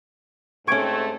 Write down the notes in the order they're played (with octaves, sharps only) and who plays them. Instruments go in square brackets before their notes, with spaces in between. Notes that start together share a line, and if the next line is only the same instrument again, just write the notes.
[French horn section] G#2 A3 C4 [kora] C#4 G4 [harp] C#6 G#6 D7